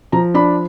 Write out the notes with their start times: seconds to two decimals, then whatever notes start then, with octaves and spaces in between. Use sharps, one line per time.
0.12 F3 A#5
0.34 D4 B5